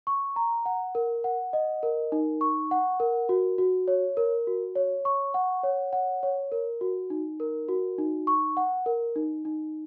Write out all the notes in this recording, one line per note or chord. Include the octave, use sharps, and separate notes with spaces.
C#6
A#5
F#5
A#4
F#5
D#5
A#4
D#4
C#6
F#5
A#4
F#4
F#4
C#5
A#4
F#4
C#5
C#6
F#5
C#5
F#5
C#5
A#4
F#4
D#4
A#4
F#4
D#4
C#6
F#5
A#4
D#4
D#4